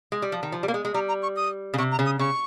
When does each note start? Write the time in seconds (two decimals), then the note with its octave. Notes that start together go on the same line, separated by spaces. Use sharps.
0.12 G#3
0.22 G3
0.32 F3
0.43 D#3
0.52 F3
0.63 G3
0.68 A#3
0.74 G#3
0.85 G#3
0.94 G3 A#5
1.08 A#5
1.23 C#6
1.36 D#6
1.74 C#3
1.78 C3 C#6
1.92 A#5
1.99 C#3
2.06 D#6
2.19 C#3 C#6